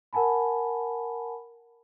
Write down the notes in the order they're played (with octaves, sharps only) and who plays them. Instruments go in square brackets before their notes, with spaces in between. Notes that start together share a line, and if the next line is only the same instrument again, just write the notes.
[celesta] A#4 F#5 G#5 A5 B5